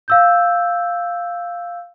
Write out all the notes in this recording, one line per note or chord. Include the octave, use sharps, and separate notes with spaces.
F5 E6 G6